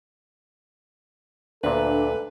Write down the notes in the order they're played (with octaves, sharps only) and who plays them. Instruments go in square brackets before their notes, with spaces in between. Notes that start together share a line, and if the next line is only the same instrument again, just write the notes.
[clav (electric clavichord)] D2 A#2 [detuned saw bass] D4 [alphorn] A4 [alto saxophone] B4